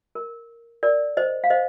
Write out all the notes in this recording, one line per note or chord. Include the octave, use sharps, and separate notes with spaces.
A#4
A#4 D5
C5 D#5
F5
C5 D#5